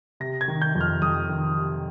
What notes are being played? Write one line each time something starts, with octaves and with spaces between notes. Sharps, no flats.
C3 A#6
G#6
D#3
G6
F2
F6
F2 D#6
D#3
C3